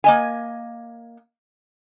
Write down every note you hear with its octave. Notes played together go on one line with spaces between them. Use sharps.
A#3 D#5 G#5